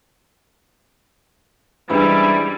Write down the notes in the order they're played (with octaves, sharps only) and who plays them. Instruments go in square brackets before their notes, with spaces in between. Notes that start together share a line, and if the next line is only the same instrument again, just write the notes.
[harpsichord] G#2 E3 [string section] G3 [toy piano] C#4 D4 [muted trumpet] E4